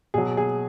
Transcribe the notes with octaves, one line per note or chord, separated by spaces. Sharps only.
B2 F#3 G#4
G#4